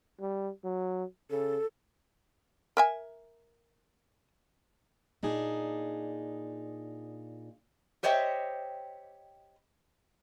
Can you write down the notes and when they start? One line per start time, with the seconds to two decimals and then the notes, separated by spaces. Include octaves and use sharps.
0.20 G3
0.64 F#3
1.30 C#3 A4
2.77 A#4 E5 G#5
5.23 A#2 D4 D#4 G#4
8.03 G4 C5 C#5 D#5 E5 G5